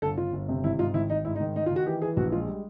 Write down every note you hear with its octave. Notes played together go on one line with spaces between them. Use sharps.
G1 A4
G1 F4
G1
C3
G#1 E4
G#2 F4
G#1 E4
G#1 D#4
G#2 E4
D#4
D#3
D#3 D#4
F4
D#3
F#4
E3 G4
E3 G#4
A#1 F#4
G#3 F4
G3